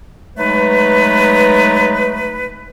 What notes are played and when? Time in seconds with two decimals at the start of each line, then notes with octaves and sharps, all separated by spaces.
0.37 F#3 G#3 A3 D#4 B4